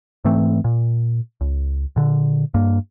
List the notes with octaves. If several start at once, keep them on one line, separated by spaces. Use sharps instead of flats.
G#2 E3 A3 C4
A#2
C#2
A#2 D3
G2 A#3